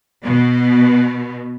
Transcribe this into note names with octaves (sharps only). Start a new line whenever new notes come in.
B2